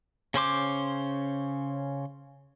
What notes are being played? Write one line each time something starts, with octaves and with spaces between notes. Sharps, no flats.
C#3 C#4 C5 D6